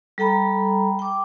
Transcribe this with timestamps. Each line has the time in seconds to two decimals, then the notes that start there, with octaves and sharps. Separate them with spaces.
0.18 G3 A4 G5 A#5 B5
0.99 G5 D6